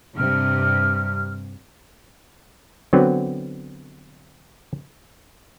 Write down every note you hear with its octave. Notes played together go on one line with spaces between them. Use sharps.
G2 C3 F6
D3 F#3 B3 C4